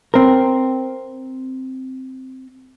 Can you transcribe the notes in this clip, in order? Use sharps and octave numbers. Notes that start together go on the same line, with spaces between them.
C4 A#4